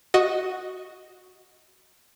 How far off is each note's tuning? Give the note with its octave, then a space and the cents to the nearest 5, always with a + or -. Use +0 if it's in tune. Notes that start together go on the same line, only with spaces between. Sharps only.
F#4 +0 D#5 +0 F#5 +0